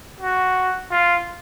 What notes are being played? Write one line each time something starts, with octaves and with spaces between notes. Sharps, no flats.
F#4
F4